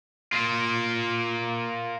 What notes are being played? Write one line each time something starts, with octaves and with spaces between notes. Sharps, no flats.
A#3 F4